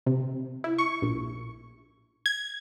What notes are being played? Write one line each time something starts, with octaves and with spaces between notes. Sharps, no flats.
C3
E4
C#6
A#1
G#6